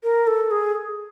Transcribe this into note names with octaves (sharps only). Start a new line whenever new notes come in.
A#4
A4
G#4